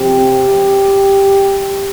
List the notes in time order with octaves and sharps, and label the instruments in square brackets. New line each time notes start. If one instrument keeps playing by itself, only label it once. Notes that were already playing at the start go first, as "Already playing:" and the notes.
Already playing: [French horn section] C3 F3 C4 G4